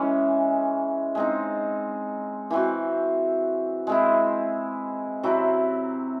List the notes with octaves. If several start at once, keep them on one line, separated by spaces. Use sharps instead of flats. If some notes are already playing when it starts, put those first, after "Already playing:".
Already playing: E3 G#3 C#4
G#3 C4 D#4
E3 C4 F#4
G#3 C4 E4
C3 F#3 C4 E4